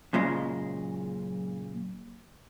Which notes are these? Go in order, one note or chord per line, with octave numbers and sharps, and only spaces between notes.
F#2 A#2 C#3 G#3